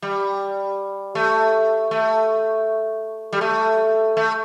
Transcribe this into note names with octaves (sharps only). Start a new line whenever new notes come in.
G3
A3
A3
G3
A3
A3